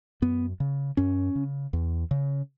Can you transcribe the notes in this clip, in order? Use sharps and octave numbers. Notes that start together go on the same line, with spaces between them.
F#2 B3
C#3
F#2 C#4
C#3
E2
C#3